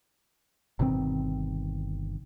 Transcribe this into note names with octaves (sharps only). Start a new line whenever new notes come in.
G1 B2 D#3 C4